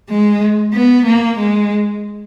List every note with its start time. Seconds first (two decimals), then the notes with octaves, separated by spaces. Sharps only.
0.10 G#3
0.74 B3
1.06 A#3
1.38 G#3